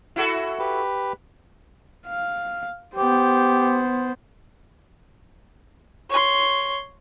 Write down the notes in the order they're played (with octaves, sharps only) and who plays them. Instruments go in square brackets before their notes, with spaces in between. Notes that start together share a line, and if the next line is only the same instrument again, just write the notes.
[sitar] E4 F#4 A4
[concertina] G4 B4
[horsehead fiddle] F5
[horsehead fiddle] B3 C5 [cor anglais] G4
[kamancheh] C#5 C6